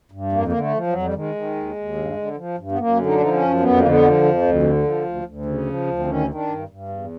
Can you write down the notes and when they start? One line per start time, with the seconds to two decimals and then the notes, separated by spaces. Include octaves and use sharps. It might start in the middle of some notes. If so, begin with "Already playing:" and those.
0.12 G2
0.32 F2 A#3
0.48 D3 A#3
0.59 A3
0.74 F3
0.87 F#3
0.93 F2
1.03 G3
1.14 D#3 G#3
1.35 D#3
1.55 D#2
1.76 D#2
1.96 G2
2.17 D3
2.37 F3
2.58 G2
2.72 B3
2.79 F#2 A#3
2.98 D3
3.06 D#4
3.14 D4
3.20 F3 D#4
3.33 C#4
3.40 F#2
3.60 F2 B3
3.79 D3 A#3
3.88 B3
4.02 F3
4.22 F2
4.42 D2
4.63 D3
4.83 F3
5.05 D2
5.25 D2
5.46 C#3
5.66 F3
5.87 D2
5.99 C4
6.06 D#3 C#4
6.27 D#3
6.34 D4
6.48 G2
6.69 G2
6.88 E2